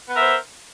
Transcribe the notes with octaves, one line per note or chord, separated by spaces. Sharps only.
B3 A#4 C5 E5